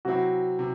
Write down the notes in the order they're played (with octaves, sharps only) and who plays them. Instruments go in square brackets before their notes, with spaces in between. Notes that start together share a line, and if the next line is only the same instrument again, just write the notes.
[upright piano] C3 F#3 C4 E4 [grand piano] F#4
[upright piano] C3